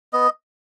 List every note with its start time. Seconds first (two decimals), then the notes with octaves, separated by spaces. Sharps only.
0.13 B3 D#5